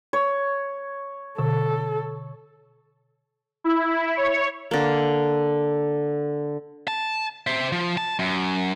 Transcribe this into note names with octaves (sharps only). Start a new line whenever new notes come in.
C#5
B2 D3 A4
E4
C#5
D3 A#3
A5
C5 E5
F3
A5
F#2